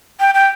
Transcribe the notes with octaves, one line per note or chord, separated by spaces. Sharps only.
G5
G5